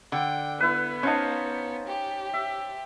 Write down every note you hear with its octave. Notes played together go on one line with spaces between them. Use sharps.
D3 G5
B3 E4 B4
C#4 D#4 C5 F5 A5
G4
E5